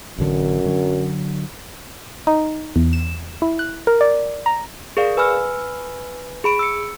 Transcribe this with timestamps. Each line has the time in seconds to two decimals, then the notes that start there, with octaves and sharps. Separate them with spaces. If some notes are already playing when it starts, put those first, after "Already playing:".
0.18 A1 F#2 D3
0.66 D3 F#3
2.27 D#4
2.76 E2
2.93 E7
3.42 E4
3.59 F#6
3.87 A#4
4.01 D5
4.46 A#5
4.97 G#4 A#4 D5 F5
5.17 B4 G#5 B5 E6 F6
6.44 G#4 B5 D7
6.59 E6 C#7